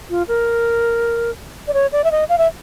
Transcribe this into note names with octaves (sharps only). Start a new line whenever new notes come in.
F4
A#4
D5
C#5
D5
E5
D#5
F5
E5